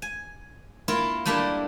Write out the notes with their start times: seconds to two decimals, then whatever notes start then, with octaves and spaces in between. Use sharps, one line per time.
0.02 G#5
0.88 A#3 E4 F4
1.25 G3 A3 A#3 D4 E4